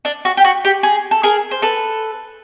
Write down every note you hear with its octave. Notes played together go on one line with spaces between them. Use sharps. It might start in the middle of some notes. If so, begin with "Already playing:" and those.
D4
F#4
G4
F#4
G4
G#4
A4
G#4 A#4
C5
A4 B4